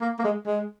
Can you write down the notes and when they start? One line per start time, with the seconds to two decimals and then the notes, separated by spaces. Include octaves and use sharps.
0.01 A#3
0.19 A#3
0.24 G#3
0.46 G#3